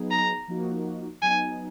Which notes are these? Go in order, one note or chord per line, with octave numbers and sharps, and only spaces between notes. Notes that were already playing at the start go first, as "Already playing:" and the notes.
Already playing: F#3 B3 D#4 G#4
A#5
F3 A#3 D#4 F#4
F#3 B3 D#4 G#5